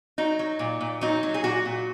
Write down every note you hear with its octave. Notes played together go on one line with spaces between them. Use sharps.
F#3 D#4
F#3
A#2
A#2
F#3 D#4
F#3
G#4
A#2 F#4
A#2